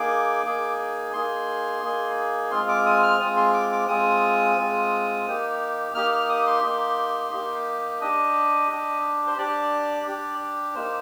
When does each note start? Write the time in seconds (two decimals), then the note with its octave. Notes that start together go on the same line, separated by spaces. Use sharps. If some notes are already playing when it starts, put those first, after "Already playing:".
Already playing: A#3 D#4 G#4 D6
0.45 A#3 D#4 G#4
1.13 A#3 D#4 G#4 C6
1.83 A#3 D#4 G#4
2.51 G#3 C4 F4 C6
2.69 D6
2.86 D#6
3.03 F6
3.20 G#3 C4 F4 D#6
3.37 C6
3.54 D6
3.72 D6
3.88 G#3 C4 F4 D#6
4.58 G#3 C4 F4
5.27 A#3 D#4 G4
5.95 A#3 D#4 G4 F6
6.12 F6
6.29 D#6
6.47 C6
6.63 A#3 D#4 G4
7.32 A#3 D#4 G4
8.00 D4 G4 D#5
8.70 D4 G4
9.27 C5
9.38 D4 G4 D5
10.07 D4 G4
10.75 A#3 D#4 G4 C5